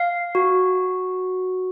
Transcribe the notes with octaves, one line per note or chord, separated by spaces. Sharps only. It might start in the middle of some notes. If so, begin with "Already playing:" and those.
Already playing: F5
F#4